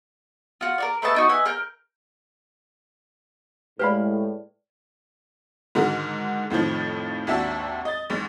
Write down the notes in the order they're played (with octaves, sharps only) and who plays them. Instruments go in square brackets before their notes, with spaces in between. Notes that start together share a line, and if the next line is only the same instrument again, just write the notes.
[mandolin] F4 F#4
A#4 C#5 D5
A3 B4 D#5 A5
D4 D#4 F#4
B4 D#5 E5 G#5
A#4 F6 G6
[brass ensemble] A2 [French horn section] G#3 [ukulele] G4 F5 B5 [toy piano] B4 D5
[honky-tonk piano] G#2 D3 D#3 F#4 A#4
F2 A2 D#3 F3
G#1 D#2 D4 F#4 E5 A5
D#5 A6
A1 G#2